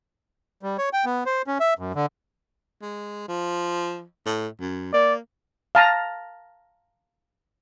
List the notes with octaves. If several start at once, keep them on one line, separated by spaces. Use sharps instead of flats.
G3
C#5
G5
B3
C5
C#4
E5
F#2
D3
G#3
F3
A2
F#2
A#3 D5
F5 A5 A#5